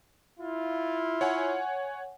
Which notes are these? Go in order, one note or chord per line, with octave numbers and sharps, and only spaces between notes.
E4 F4
C#5 F#5 G#5